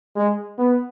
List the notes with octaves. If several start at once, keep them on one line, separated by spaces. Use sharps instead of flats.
G#3
B3